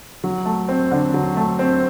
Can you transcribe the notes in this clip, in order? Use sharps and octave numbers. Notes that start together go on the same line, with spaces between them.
F#3
A3
C4
D3
F#3
A3
C4